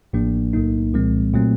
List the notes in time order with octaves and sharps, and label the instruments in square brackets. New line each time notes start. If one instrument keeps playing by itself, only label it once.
[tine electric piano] A1 A2 F3 A#3 D4
B1 A2 F#3 A#3 D#4
C2 A#2 F3 G#3 C4
A#2 F#3 A3 C4